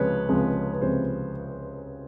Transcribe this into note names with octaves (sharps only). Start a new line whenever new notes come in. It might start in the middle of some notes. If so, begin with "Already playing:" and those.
Already playing: C#2 C3 F3 G#3 B4 C#5
C#2 C3 F3 G#3
B4
C#2 C3 F3 G#3 C5